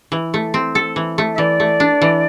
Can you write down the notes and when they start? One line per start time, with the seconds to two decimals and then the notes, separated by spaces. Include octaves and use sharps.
0.12 E3
0.34 A3
0.54 C4
0.75 A4
0.96 E3
1.18 A3
1.34 E5
1.38 E3 D5
1.60 A3
1.80 D4
2.02 E3